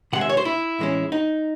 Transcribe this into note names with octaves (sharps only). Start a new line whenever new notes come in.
C3 D#3 G#3 F#5
E5
C#5
C5
E4
A2 E3 G#3 C#4
D#4